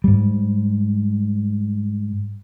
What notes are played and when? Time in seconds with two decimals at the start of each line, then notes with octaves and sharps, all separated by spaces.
0.04 G#2 G3